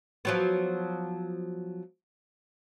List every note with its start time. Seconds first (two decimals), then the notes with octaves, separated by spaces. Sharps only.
0.25 F3 F#3 B3